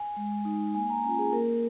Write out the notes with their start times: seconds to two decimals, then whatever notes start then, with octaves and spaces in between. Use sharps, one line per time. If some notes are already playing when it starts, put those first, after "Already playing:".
Already playing: G#5
0.17 G#3
0.45 D#4
0.74 A#3 G#5
0.90 A#5
1.04 C#4 F4 G#5
1.18 G#4
1.33 A#3 A#4